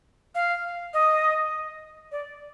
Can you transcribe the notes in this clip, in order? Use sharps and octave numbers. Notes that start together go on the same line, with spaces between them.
F5
D#5
D5